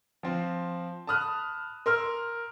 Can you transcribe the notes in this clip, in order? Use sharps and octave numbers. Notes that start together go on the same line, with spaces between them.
F3 C4
A5 B5 D#6 F6 F#6
A#4 C6 E6 F6